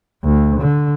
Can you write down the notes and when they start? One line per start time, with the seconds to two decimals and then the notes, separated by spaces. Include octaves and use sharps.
0.24 D2
0.61 D3